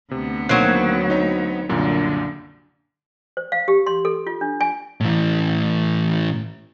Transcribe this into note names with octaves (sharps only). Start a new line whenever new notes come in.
D2 C3 B3
D#3 F#3 A#3 C4 F#6
D#4 C#5
C2 F#2 A#2 D3
C5
F5
G4
C6
A4
F4
D4
G#5
A2 E3